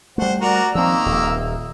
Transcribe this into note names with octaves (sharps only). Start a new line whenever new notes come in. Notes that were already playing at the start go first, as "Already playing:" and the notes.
G3 A3 C5 F#5
F#4 A#4 D5
D#3 F3 A#3 C4 E6
D#1